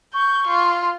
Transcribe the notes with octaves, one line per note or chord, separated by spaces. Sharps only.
C#6 G6
F4